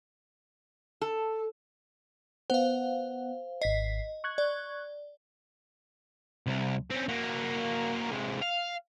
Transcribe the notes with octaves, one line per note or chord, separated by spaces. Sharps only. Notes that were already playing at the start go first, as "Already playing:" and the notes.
A4
B3 C5 F5 F#5
G#1 D#5 B6 C7
C#6 F#6 G#6
D5
C2
C4 C#4
A#3 F#4
C3 G#3
F5